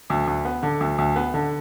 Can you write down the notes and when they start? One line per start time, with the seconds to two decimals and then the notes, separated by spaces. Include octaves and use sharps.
0.10 D2
0.27 D2
0.45 B3
0.63 D3
0.81 D2
0.98 D2
1.16 B3
1.34 D3